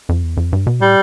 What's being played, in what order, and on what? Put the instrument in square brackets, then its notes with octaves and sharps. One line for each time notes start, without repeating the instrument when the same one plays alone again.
[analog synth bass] F2
E2
F2
G2
B2
[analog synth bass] A2 [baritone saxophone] G3